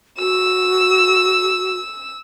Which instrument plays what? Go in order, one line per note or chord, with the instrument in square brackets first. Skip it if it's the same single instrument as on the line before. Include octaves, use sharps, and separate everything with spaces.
[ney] F#4 [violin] E6